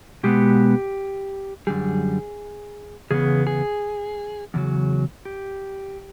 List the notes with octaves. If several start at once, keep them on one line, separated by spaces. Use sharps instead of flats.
B2 G#3 B3 G4
F#2 D3 G3 G#4
E2 C#3 B3 G#4
G#4
E2 C#3 F#3
G4